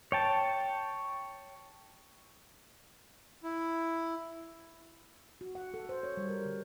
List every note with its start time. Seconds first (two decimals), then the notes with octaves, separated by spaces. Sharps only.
0.12 C#5 G5 A5
3.44 E4
5.41 F#4
5.55 F#5
5.74 A4
5.89 C5
6.03 C#5
6.17 G3
6.29 A#4
6.45 D3